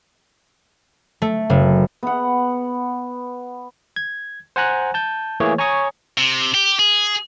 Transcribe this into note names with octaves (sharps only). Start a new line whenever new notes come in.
A3
F#1
B3 F#5
G#6
C5 F#5 G#5 A#5 F#6
A5 G6
E3 A3 A#3 G#4 C#5
C#5 G#5 A#5 C#6 D#6
C3
G4
G#4